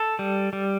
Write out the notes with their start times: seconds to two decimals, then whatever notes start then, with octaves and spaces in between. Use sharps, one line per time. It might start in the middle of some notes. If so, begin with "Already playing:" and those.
Already playing: A4
0.19 G3
0.53 G3